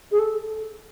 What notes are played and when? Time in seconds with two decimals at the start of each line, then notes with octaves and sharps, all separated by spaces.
0.11 G#4
0.19 A4